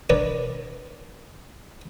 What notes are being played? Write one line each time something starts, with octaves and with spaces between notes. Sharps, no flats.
D4 A#4 B4 C#5 D5 A#5